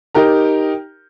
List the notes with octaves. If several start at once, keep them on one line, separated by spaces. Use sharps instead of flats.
D#4 G4 A#4 A#5